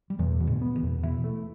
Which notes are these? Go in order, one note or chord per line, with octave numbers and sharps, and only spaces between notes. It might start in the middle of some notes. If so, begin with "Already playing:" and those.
G3
E2 B2 E3
B2 E3
A2 D3
B3
B2 E3
E2
B2 E3 E4
A3